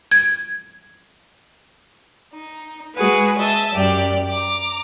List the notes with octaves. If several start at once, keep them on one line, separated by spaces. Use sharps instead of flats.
G#6
D#4
G#3 F#4 G#4 B4
D#5 E5 A5
F#2 G4 D5
A#5 D6